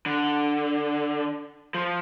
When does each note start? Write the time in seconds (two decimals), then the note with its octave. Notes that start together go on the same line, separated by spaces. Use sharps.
0.06 D3
1.74 F3